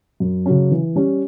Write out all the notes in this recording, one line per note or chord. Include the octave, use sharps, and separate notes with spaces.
F#2
C#3 F#3 C#4
E3
G3 C#4